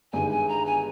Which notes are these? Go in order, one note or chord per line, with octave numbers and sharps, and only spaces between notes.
G1 G2 D#3 G#3 G#5
G#5
A#5
G#5